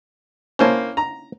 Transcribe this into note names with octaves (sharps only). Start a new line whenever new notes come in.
A#3 C#4 E4 C5 C#5 A5
A#5